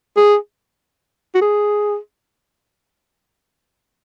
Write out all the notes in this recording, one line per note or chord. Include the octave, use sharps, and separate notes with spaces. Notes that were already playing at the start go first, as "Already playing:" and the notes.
G#4
F#4
G#4